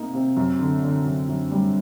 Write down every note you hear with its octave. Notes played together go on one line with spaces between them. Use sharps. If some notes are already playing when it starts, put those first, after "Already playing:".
Already playing: C3 A#3 D#4
C3
F#2
D3
D3
F#2
F#2
G3